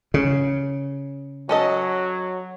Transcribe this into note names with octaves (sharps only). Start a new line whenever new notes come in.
C#3
F#3 C#4 A4 D#5